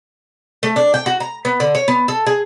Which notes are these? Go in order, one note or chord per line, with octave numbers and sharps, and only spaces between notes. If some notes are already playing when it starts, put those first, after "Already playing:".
A3
D4
G5
F#4
A#5
B3
D3
C#5
B3
A4
G#4